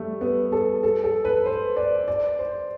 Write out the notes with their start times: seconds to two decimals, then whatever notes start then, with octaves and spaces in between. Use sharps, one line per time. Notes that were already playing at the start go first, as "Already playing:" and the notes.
Already playing: G3 A3
0.21 B3
0.52 A4
0.83 A4
1.04 A4
1.25 B4
1.46 C5
1.77 D5
2.08 D5
2.39 C5